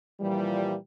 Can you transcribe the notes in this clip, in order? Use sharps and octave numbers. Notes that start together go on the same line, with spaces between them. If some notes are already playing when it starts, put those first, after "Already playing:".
A#2 E3 F3 G3